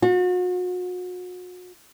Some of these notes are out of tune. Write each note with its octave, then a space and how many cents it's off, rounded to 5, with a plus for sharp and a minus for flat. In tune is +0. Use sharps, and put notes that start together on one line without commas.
F#4 -40